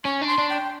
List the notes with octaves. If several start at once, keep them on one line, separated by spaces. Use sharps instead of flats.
C#4 C#6
D4
C6
D4
G5